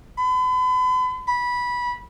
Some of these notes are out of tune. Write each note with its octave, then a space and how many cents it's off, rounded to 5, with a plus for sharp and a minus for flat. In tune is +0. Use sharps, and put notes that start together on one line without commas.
B5 +40
B5 -15